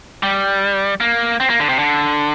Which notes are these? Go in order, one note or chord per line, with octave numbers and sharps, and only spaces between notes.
G3
A#3
C4
A#3
D3
C3
D3